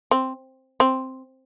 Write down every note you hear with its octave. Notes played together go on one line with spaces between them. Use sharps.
C4
C4